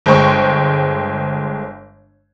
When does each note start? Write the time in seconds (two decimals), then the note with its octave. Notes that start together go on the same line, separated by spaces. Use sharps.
0.06 G1 G#3 C5 G5 C#6